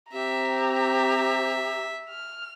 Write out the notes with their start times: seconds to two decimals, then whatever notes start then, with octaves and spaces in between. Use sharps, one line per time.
0.13 C4 G4 E5 A#5
0.71 E5
2.10 F6